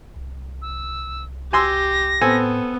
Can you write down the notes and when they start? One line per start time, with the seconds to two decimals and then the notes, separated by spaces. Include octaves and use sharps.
0.16 C2
0.62 E6
1.53 G4 G#5 C6 E6 A#6
2.21 A2 B3 C4 A4 G#5